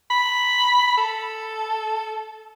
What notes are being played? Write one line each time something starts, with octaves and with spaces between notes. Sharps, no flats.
B5
A4